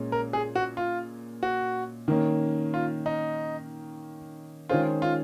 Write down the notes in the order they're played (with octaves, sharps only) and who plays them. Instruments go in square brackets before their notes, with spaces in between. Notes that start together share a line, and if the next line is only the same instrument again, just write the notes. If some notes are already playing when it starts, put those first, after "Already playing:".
Already playing: [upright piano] A#2 G#3 C#4
[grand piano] A#4
G#4
F#4
F4
F#4
[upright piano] D#3 A#3 C#4
[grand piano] F4
D#4
[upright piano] D#3 G#3 C#4 G#4 C5 [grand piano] F4
[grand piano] F4